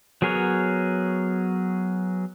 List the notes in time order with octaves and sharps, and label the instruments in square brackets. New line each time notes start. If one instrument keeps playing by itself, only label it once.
[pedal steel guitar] F#3 B3 G#4 A#4 C#5